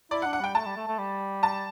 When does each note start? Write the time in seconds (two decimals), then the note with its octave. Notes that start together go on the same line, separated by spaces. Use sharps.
0.11 E4 D5
0.22 F#5
0.26 D4
0.33 F#5
0.40 G3 G5
0.55 A3 A5
0.66 G3
0.77 A3
0.88 A3
0.99 G3
1.43 A5